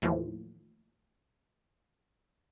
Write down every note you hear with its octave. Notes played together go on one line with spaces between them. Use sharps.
D#2 A2 E3 F3